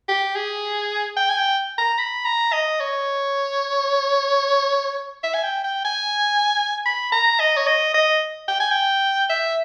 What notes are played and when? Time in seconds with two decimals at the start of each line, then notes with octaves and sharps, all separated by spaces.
0.09 G4
0.36 G#4
1.17 G5
1.29 G#5
1.37 G5
1.78 A#5
1.98 B5
2.25 A#5
2.53 D#5
2.80 C#5
5.24 E5
5.34 G#5
5.44 G5
5.64 G5
5.85 G#5
6.86 B5
7.12 A#5
7.40 D#5
7.57 C#5
7.67 D#5
7.94 D#5
8.48 G5
8.60 G#5
8.71 G5
9.30 E5